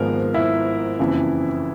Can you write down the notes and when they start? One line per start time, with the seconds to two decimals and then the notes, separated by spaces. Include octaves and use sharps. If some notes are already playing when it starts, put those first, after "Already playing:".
Already playing: G#1 G#2 F3 G#3 A#3 B3 A#4
0.34 E4 E5
0.99 F#1 F2 C#3 E3